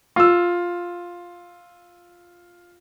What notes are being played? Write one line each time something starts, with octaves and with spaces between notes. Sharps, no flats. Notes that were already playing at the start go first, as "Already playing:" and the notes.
F4 E6